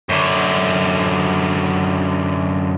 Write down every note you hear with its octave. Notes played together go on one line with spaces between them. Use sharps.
F#2 D3